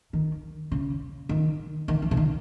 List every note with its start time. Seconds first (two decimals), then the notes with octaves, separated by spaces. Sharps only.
0.13 D#3
0.72 C#3
1.29 D#3
1.88 D#3
2.02 E3
2.11 C#3
2.17 D#3